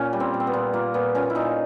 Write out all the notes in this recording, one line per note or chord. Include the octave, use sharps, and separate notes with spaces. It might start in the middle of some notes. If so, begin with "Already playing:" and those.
Already playing: A#2 C#4
G3
C4
A#2
C4
B3
A#2
A#2 A#3
A#2 B3
A#2 C#4
E4
A#2 D#4